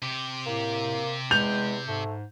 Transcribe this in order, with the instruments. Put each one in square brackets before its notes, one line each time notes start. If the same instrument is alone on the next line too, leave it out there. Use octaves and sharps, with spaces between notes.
[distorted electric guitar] C3 G4
[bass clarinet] A2 [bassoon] A#3
[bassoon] E2 [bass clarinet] G#3 [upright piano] G6 F7
[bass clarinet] G#2 [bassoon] A3